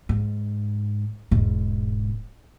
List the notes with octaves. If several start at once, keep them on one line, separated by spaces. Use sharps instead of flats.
G#2
E1 G#2